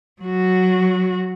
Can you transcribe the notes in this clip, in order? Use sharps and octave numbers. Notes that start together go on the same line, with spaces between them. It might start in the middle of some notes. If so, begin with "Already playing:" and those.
F#3 F#4